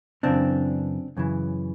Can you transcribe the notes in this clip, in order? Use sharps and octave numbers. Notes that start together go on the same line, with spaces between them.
F#2 C#3 E3 C4 D4
F#2 C#3 E3